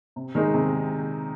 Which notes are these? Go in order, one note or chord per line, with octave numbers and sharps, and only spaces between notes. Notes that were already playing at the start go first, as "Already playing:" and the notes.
C3
D#3 G#3 D#4
C3